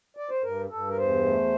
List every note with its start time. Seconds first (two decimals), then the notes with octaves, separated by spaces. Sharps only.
0.17 D5
0.29 C5
0.43 G2 A#4
0.70 G2 A4
0.89 A#4
0.97 E2 C5
1.25 A3